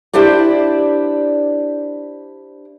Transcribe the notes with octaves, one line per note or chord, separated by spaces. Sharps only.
D4 E4 G4 C5 D5